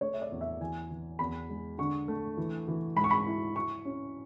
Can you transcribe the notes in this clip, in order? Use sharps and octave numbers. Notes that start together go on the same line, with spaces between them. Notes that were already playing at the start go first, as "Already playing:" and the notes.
A3 C#5
E5
D5
E2
E5
E3 G#5
E3
E2 B5
G#3
D3 C#6
A3
E3
E3
G#2 B5
C#6
B5
E4
E4 C#6
C#4